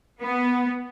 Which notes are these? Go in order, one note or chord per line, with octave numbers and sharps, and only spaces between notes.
B3